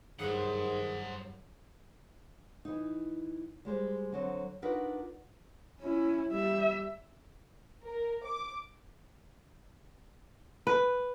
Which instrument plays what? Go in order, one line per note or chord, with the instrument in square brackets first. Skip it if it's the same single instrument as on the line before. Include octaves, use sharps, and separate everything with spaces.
[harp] F#1 G2 [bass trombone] D#3 [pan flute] G#4 [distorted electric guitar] C5 F#5
[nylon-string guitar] E3 D#4
G3 G#3 C5
D3 F#3 C4
D4 D#4 F4 F#4 A#4 B4
[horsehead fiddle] C#4 E4
G3 E5
[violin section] A#4
D6
[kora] B4